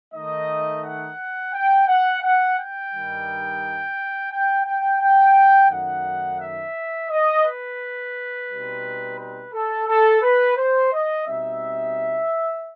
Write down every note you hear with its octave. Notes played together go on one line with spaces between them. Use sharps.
D#3 A3 D#4 D#5
F#5
G5
F#5
F#5
G5
G2 D#3 G3 D#4
G5
G5
G5
F#2 D#3 A3 D#4 F#5
E5
D#5
B4
B2 G3 C4 D#4
B4
A4
A4
B4
C5
D#5
B2 G3 C4 D#4 E5